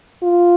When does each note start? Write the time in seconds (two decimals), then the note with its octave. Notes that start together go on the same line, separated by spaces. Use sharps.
0.24 F4